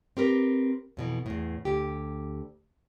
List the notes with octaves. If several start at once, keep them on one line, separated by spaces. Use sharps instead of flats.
C4 G4 A#4 B4
F2 B2 E3
E2 A2
D2 G4